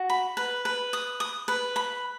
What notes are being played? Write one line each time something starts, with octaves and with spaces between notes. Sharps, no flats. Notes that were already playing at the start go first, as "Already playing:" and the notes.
Already playing: F#4
B5
B4
B4
D#6
D#6
B4
B5